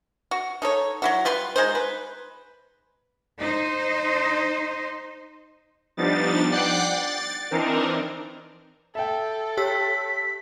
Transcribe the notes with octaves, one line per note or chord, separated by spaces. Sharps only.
F#4
D#4 A4 C#5
F#3 E4 F#4
G3 F4 B4 C6
G#3 D#4 C5
B4
D#4 C5
F3 G3 B3 D4 D#4 A6
D5 F#5 G5 D6 F#6 C7
A6
E3 C4 D4 D#4 A#4
A4 E5 G5
G4 C#5 E6 B6